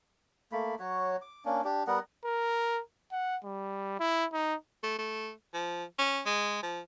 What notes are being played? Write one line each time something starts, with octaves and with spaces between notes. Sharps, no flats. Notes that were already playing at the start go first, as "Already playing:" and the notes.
A3 A#3 B5
F#3 F#4 C#5
D6
A#3 C#4 D4
D4 G4
G3 B3 A#4 F#5
A#4
F#5
G3
E4
D#4
A3
A3
F3
C#4
G#3
F3